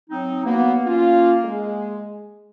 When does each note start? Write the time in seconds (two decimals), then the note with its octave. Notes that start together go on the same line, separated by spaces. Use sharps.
0.10 F#3 C4 D#4
0.45 F#3 A#3 B3
0.86 C#4 F4
1.44 G#3